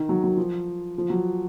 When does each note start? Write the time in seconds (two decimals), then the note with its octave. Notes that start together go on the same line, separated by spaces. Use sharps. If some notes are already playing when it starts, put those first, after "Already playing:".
Already playing: D#3
0.09 F#3
0.24 F#3
0.37 F3
0.98 F3
1.10 F#3